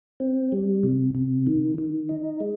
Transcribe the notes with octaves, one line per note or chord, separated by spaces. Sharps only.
C4
G3
C3
C3
D#3
D#3
D#4
G#3